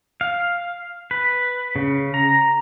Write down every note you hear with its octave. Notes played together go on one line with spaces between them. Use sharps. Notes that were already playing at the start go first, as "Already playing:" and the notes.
F5
B4
C#3
A#5